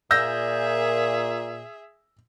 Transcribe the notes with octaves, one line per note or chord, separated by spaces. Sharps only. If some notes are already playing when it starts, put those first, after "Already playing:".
A#2 G#4 E5 E6 G6 A#6